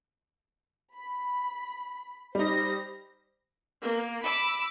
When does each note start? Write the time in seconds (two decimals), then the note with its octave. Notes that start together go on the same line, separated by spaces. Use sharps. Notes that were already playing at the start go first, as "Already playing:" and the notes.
0.94 B5
2.35 G3 D#4 C5 A#6
3.81 A#3
4.22 B5 D6 E6